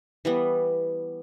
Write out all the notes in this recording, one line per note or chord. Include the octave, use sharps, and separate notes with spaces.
E3 G3 B3